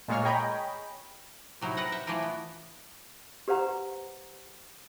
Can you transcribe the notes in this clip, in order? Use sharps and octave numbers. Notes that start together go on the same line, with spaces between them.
A#2 G#3 A#3 C#5 F6
G#4 C#5 D#5 G5 A#5 B5
C3 F#3 D#4 E4
C3 A#4 B4 D#5 F#5 A#5
E5 F#5 G5
E3 A3 D4 E4 F4 A#4
B3
G4 B4 C5 F#5 A#5